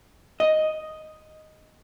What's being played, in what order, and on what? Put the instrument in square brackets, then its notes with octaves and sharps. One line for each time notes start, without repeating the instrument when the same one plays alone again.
[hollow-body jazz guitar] D#5